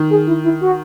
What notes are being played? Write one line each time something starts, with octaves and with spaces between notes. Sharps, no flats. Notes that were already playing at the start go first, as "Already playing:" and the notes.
Already playing: D#3
G#4
E4
E4
F#4